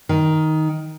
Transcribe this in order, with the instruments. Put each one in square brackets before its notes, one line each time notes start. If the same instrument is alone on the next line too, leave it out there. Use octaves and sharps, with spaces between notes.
[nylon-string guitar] D#3